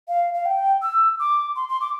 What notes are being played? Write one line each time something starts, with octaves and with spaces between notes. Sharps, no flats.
F5
F5
G5
E6
D6
C6
C6
D6